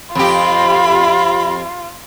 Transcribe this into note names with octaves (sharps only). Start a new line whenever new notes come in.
F2 F4 G4 B5